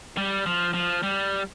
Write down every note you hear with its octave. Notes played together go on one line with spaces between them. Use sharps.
G3
F3
F3
G3